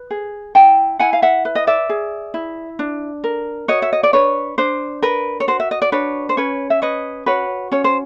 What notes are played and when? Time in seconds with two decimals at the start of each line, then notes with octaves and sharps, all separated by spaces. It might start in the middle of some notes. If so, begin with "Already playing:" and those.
Already playing: B4
0.11 G#4
0.55 E4 G5 A5
0.99 E4 F#5 G#5
1.13 F5
1.22 E5 F#5
1.45 B4
1.55 D#5
1.67 D5 E5
1.89 G#4
2.34 E4
2.79 D4
3.24 A#4
3.68 F#4 C#5 D#5
3.82 E5
3.93 D#5
4.03 D5
4.13 D4 B4 C#5
4.58 D4 C5
5.02 A#4 B4
5.40 C#5
5.48 F#4 C5
5.60 E5
5.71 D#5
5.82 D5
5.92 D4 B4 C#5
6.29 C5
6.37 C#4 B4 C#5
6.70 E5
6.82 B4 C#5 D#5
7.26 F#4 B4 C#5
7.72 C#4 C#5
7.84 C5